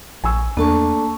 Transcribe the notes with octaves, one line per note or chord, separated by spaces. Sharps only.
A#1 G#5 C#6 E6
E2 A3 A#3 D4 A5 C#6